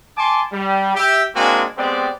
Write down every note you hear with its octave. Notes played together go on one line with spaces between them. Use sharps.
G#5 A5 C6 D6
G3
G4 E5
G#3 A#3 C4 D4 F#4 G#5
G#3 B3 C4 G4 D5